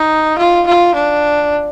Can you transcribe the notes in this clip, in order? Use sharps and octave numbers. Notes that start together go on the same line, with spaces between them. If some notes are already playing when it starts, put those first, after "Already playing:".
Already playing: D#4
F4
F4
D4